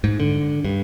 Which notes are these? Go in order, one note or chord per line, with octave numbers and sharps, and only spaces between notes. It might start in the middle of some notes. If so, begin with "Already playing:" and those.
G#2
D3
G2